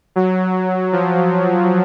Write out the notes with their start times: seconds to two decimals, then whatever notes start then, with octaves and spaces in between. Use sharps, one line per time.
0.16 F#3
0.93 F3